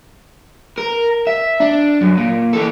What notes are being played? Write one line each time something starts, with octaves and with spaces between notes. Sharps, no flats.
A#4
E5
D4
F#2
A#2
E3 A4